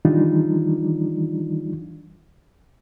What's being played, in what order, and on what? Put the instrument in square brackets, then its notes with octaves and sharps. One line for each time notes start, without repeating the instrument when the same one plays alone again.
[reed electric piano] D#3 E3 G3 D4 D#4 F4